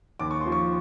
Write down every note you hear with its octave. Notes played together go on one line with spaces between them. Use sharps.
D#2 D6
C#6
C6
F3
C#6